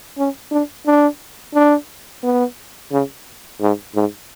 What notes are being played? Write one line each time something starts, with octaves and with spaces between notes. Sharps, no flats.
C#4
D4
D4
D4
B3
C#3
G#2
G#2